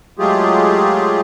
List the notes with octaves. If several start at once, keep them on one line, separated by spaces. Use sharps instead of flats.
F#3 G#3 A3 F4 G4 G#4